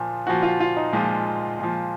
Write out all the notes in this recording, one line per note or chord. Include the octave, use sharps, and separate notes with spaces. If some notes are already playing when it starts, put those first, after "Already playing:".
Already playing: A#2 F3
A#2 F3 F#4
F4
F4
D#4
A#2 F3 G#3
A#2 F3